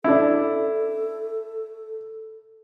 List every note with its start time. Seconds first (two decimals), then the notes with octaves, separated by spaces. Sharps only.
0.04 D4 E4 A4